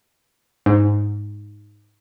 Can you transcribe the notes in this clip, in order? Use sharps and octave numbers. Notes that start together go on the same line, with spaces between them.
G#2